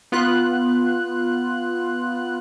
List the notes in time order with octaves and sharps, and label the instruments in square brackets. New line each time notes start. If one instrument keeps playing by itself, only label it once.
[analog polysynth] B3 F4 F#6